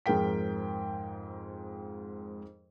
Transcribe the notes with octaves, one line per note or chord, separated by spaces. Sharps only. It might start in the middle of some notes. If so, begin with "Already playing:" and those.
F2 G#2 G#4 A#4 G5 B6